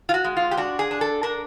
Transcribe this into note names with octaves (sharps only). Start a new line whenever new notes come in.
F4
F#4
G#3
F4
G4
D4 F#4
G#4
D4
A4
D4 A#4